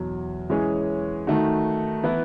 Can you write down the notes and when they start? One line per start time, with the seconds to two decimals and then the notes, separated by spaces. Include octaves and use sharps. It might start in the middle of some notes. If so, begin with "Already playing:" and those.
Already playing: E2 B2 F#3
0.50 E3 G#3 C#4 G#4 C#5
1.27 D#3 A3 D#4 F#4
2.03 E3 B3 E4 B4